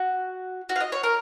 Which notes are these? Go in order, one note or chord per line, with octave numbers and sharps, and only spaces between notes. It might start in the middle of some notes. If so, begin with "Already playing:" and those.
Already playing: F#4
F#4
F5
D#5
C#5
A#4